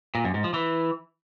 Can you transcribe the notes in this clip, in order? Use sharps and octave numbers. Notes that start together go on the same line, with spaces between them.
A#2
F#2
G#2
F3
E3